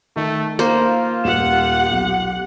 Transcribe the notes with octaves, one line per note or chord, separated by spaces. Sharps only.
D#3 A3
A#3 F4 C5
D#1 G4 F#5 E7
B1